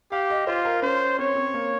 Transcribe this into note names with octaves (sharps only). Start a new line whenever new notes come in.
G4 F5
D#5
F4 C5
A#4
C#4 C5
C4 C#5
C4
A#3